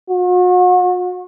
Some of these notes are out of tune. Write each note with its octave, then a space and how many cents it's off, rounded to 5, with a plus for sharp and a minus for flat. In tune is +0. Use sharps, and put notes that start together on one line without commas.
F#4 -40